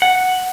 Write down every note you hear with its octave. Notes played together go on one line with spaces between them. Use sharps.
F#5